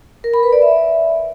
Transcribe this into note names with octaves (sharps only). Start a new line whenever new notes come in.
A#4
B5
B4
D5
E5